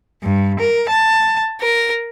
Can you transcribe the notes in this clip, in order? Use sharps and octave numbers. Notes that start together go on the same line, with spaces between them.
G2
A#4
A5
A#4